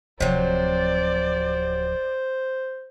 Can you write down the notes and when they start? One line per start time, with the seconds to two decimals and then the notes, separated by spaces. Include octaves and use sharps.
0.20 D1 C3 F3 F#3 C5 D5